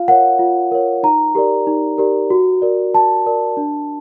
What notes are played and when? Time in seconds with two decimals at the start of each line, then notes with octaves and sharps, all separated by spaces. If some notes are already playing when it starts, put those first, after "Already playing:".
Already playing: F4 F5
0.08 A#4 C#5 F#5
0.39 F4
0.71 A#4 C#5
1.03 D#4 A#5
1.35 G4 A#4 D5
1.67 D#4
1.98 G4 A#4 D5
2.30 F#4
2.62 A#4 D5
2.94 F#4 A5
3.26 A#4 D5
3.57 D4